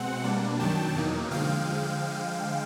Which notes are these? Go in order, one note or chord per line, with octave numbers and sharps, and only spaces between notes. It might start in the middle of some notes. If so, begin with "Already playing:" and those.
Already playing: B2 G#3 C4 F#5
B2 G3 A#3 D4
F#2 D#3 F#3 G5 A5
E2 B2 F#3 A#3 D#4
D3 F3 G#3 F5 G5